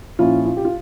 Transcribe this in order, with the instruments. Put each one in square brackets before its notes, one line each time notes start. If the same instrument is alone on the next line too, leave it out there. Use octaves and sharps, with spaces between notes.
[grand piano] A#2 F3 C#4 E4 [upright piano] F4
[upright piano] F4
G4
F4